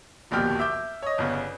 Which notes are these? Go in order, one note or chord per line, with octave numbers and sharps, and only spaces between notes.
D1 A#1 D#2 B2 G4 F6
E5 D6 G6
C#5 D#5
G1 C#3 B3